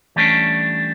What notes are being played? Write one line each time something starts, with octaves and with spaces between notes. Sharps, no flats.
E3 G3 A3 C#4 D4